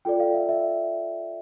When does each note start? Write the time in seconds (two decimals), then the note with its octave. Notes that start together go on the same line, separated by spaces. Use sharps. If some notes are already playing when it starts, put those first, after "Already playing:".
0.05 F4 A4 D5 G5
0.20 F5
0.34 E5
0.49 E5